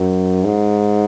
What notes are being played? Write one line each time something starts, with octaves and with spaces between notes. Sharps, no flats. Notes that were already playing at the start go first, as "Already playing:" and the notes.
Already playing: F#2
G#2